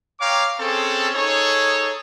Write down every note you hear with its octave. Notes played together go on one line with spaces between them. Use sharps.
C#5 F5 G5 A#5 D6
C4 C#4 G#4 A4
D#4 G#4 A4 C#5